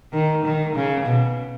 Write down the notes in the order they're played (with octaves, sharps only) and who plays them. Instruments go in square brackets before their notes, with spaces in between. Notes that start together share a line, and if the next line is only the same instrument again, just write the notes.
[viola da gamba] D#3
D#3
C#3
B2